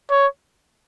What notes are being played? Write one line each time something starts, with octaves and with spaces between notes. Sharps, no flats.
C#5